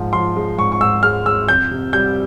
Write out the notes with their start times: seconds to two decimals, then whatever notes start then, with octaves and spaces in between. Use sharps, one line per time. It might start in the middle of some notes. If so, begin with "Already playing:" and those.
Already playing: G#2 F3
0.13 F3 C6
0.36 G#3
0.58 G#2 C#6
0.72 C#6
0.81 G#2 E6
1.03 G#3 F6
1.26 G#3 E6
1.48 F2 G6
1.71 C3
1.93 G3 G6